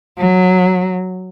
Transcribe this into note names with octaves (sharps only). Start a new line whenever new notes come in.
F#3